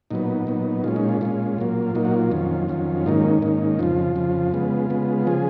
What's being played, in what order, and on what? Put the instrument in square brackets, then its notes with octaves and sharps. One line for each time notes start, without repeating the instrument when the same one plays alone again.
[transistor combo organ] A#2 F#3 B3 D#4
A#2 F#3 B3
A#2 G#3 C#4 F4
D#4
F4
A#2 G#3 C#4 F4
A#2 F#3 A#3
A#2 F#3 A#3 D#4
F#4
F4
F2 D#3 F#3 C#4
F2 D#3 F#3 C#4
G#2 D#3 A#3 C#4 D#4
G#2 D#3 A#3 C#4
F2 C#3 F3 F4
F2 C#3 F3
C#3 G#3 B3
C#3 G#3 B3
C#3 F3 G#4